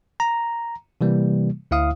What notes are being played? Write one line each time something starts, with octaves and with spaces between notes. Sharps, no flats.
A#5
C3 E3 G3 A#3
D2 E4 F5 D#6